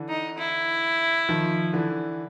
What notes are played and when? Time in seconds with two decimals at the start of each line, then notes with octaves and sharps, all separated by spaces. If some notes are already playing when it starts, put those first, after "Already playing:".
Already playing: D3 E3
0.09 D#4
0.39 E4
1.29 D#3 F3
1.73 D3 E3